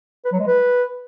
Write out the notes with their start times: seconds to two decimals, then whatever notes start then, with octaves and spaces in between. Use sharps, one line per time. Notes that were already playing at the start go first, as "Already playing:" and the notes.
0.25 B4
0.32 F#3
0.40 G#3
0.47 B4